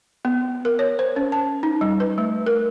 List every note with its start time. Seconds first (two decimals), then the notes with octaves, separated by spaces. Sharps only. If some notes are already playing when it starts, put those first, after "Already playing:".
0.25 B3
0.65 A#4
0.79 C#5
0.99 C5
1.16 C#4
1.32 A5
1.63 D#4
1.81 G3
2.00 B4
2.18 A3
2.46 A#4